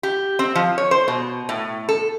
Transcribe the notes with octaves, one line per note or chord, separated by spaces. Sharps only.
G4
C4
F3
C#5
C5
B2
A2
A4